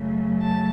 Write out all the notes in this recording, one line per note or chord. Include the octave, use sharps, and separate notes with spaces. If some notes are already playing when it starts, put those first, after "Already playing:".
Already playing: F#2 C#3 F#3 A3
A5